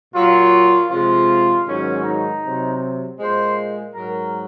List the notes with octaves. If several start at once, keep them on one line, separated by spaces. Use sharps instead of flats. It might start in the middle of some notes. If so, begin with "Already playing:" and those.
A#2 F#3 F4
C3 F3 G#3 F4
G#2 D#3 F#3 C#4
D#4
C3 F#3
A#2 G#3 C5
G#2 F#3 A#4